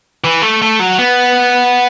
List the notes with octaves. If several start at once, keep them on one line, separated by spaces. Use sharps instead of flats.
E3
A3
A3
F#3
B3